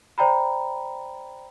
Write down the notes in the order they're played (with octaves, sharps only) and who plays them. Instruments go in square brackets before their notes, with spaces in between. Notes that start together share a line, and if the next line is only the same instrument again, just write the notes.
[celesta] C5 D5 G5 A#5 B5